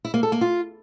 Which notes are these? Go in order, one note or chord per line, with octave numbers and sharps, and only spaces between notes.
E4
A#3
A4
A#3
F4